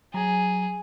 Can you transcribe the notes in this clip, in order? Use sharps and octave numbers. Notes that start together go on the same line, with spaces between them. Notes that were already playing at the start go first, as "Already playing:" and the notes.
F#3 G#4 A#5